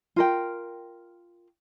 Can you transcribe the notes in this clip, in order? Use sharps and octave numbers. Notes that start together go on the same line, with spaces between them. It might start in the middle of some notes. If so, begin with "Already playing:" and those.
F4 A#4 G5